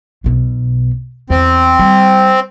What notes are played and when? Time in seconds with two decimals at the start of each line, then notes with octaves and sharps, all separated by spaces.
0.24 B1 B2
1.30 E2 C4
1.79 G3